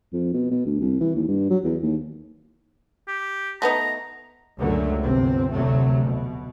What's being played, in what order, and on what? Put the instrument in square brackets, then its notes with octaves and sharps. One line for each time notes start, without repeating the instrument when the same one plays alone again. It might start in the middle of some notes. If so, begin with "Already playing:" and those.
[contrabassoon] F2
B2
B2
D2
C2
E3
D#2
G2
F#3
E2
D#2
[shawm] G4
[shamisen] A3 B3 D#4 [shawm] A#5
[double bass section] C#2 F#2 D3 F#3 A3
G1 C3 C4
F1 D2 C3 F#3 A3
B2